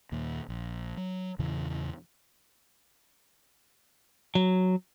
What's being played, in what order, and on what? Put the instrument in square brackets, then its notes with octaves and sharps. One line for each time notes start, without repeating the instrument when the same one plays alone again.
[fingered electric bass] D#2 A#2
A#1
F#3
E2 A#2 C#3 E3
[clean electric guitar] F#3